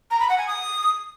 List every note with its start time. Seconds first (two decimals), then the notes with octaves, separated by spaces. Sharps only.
0.11 A#5
0.20 B5
0.29 F#5
0.38 G#5
0.47 D#6